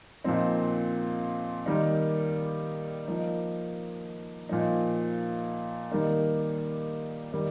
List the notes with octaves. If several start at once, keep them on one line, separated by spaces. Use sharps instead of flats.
A#2 F3 C4 D#4
D#3 G3 A#3 D#4
F3 A#3 D#4
A#2 F3 D#4
D#3 G3 A#3 D#4
D#3 G3 A#3 D#4